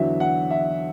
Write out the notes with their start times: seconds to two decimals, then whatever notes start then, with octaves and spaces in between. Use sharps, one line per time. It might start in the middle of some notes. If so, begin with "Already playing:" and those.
Already playing: E2 D3 F#3 E5
0.20 F#5
0.51 E5